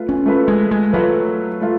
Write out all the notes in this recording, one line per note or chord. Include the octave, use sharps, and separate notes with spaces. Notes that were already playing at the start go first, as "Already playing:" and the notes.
Already playing: A3 F4 B4
C#4
A3 F4 B4
G#3
G#3
F#3 A3 F4 B4
A3 F4